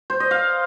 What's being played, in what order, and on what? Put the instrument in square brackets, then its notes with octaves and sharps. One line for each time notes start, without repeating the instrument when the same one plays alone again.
[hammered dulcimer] C5
D#5
F5